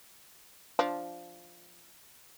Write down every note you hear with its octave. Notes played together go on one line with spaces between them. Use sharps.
F3 D4